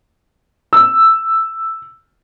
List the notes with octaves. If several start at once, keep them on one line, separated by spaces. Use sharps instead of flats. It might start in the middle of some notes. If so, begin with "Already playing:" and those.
E6